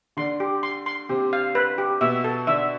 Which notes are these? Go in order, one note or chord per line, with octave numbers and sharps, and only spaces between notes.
D3 D4 C6
G4
C6
C6
C3 C4 G4
F5
B4
G4
B2 B3 E5
A4
D3 D4 E5